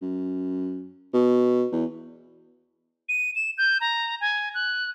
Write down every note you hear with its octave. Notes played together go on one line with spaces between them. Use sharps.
F#2
B2
E2
D#7
E7
G6
A#5
G#5
F#6